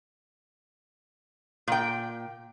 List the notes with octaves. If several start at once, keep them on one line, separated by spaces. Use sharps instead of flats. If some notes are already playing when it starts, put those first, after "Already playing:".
A#2 G5